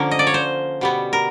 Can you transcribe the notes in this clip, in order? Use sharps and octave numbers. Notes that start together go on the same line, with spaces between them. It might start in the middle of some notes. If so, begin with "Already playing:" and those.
Already playing: D3 F3 A#3 C#4 A#4
D#5
D5
C#5
C5
B2 G3 B3
A#4